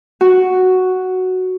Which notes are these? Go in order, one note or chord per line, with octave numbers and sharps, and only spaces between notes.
F#4